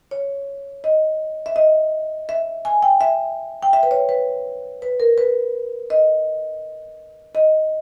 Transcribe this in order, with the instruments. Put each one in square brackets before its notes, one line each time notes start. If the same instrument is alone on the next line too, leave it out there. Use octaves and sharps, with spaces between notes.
[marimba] C#5
D#5
E5
D#5
E5
G#5
G5
E5
G5
E5
B4
C#5
B4
B4
A#4
B4
D#5
D#5